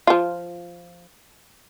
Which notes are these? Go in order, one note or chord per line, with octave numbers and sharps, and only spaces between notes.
F3 F4